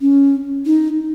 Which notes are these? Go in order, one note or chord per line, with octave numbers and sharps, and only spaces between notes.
C#4
D#4